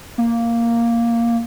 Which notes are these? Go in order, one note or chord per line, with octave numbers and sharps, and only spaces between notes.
A#3